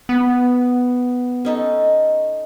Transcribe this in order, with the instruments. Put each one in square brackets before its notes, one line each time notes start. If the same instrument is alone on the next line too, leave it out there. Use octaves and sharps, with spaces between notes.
[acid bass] B3
[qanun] C#4 D#4 A4